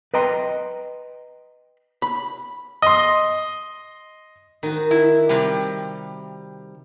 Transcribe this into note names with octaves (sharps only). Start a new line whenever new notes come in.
B4 D#5 G5 A#5 C6
B5
D#5 C6
D#3 F#4
E4
C3 G3